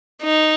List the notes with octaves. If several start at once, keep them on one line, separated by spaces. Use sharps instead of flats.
D#4